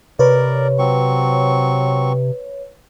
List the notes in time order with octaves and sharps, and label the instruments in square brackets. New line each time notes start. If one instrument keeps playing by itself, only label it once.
[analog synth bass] C3 [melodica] A#4 D5 [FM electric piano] B4 C#5
[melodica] F#3 C4 C#6